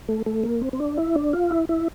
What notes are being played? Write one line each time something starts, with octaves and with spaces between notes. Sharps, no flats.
A3
A3
A#3
C4
C4
D4
E4
D4
F4
E4
E4